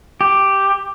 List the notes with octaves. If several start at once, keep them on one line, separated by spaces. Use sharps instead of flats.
G4